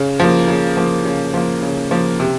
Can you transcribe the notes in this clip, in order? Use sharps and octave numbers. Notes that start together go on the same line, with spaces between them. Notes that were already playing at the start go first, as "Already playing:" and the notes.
Already playing: C#3
F3 A#3
C#3
F3 A#3
C#3
F3 A#3
C#3
F3 A#3
C3